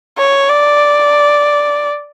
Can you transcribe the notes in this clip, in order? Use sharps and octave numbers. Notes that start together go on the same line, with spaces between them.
C#5
D5